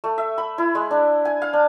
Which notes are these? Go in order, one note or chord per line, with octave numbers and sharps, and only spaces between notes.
A3
E5
B5
E4
G#3
D4
G#5
F5
D4